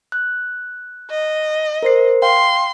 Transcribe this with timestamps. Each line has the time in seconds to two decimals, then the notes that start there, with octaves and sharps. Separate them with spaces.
0.12 F#6
1.10 D#5
1.83 A#4 C5 C7
2.22 F5 G5 C6